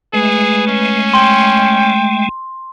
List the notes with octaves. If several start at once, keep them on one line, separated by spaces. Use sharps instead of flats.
G#3 A3 G#4 B4
C#4
G5 C6